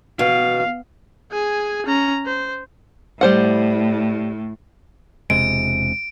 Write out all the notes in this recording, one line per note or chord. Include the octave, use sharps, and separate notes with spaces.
B2 F5
G#4 G#5
C#4 A#5
C5
A2 G3 C5 F#5
E1 C3 G#3 D7